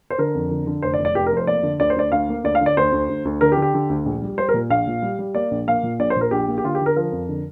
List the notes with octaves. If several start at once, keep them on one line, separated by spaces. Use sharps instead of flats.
C5
D3 A#4
F2
D3
D3
F1 C5
D5
F1
D5
F1 G4
A#4
F2 C5
A#3 D5
D3
D2 D5
C5
D2 D5
D2 F5
A#3
D2 D5
F5
D3
D5
D2 C5
D2
D2
D2
D3 A#4
G4
D3
G4
D3
D2
A#1
G3
G3 C5
A#4
A#2
A#1 F5
A#2
G3
G3
A#3 D5
A#1
A#3 F5
A#2
A#1 D5
C5
A#2 A#4
A#1 G4
A#3
G4
D3 F4
G4
D3
A#4
F3 A#4
F2
D3